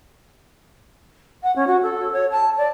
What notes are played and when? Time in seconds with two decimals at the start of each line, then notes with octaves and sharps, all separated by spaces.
1.43 F#5
1.55 C#4
1.66 F#4
1.82 A4
2.12 C#5
2.31 A5
2.57 D5